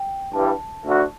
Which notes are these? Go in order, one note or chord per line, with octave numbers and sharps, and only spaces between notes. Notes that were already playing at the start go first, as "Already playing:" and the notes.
Already playing: G5
G2 E3 G3 A5
D2 D3 A3 D4 F#4